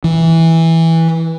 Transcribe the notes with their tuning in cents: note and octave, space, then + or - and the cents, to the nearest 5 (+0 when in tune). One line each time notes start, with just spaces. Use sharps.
E3 -10